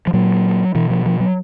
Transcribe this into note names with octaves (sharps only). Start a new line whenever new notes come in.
F3
A#2 F#3
B2 E3
F3
F3
F#3